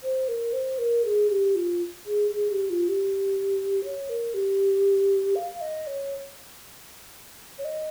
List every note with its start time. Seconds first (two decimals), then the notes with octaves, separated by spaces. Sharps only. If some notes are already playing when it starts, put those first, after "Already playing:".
0.03 C5
0.28 A#4
0.53 C5
0.78 A#4
1.05 G#4
1.30 G4
1.55 F4
2.06 G#4
2.31 G#4
2.51 G4
2.70 F4
2.88 G4
3.84 C#5
4.09 A#4
4.34 G4
5.35 F5
5.61 D#5
5.87 C#5
7.59 C#5
7.65 D#5